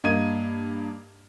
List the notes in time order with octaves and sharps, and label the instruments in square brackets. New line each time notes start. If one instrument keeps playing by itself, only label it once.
[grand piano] G2 A#3 D#5 G#6 D#7